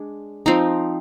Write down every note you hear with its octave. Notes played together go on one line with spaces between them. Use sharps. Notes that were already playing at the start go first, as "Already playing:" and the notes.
Already playing: G#3 D4
F3 C4 D#4